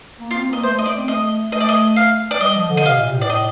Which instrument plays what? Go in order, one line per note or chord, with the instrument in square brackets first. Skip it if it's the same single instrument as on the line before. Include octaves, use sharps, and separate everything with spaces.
[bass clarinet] A#3
[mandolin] F4
[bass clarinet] C4
[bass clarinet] A#3 [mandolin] D#5
[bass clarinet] A3 [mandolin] C5
[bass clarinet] A3
[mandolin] D#5
D5
[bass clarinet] C4
[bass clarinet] A3 [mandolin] D#5
[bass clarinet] A3 [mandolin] D#5
[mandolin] D5
D#5
F5
D5
[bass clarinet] G3 [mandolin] D#5
[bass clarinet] F3
D3
[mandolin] D#5
[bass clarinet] C3 [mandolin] F5
[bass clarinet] A#2
C3
A2
[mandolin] D5
[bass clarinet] A2 [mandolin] D#5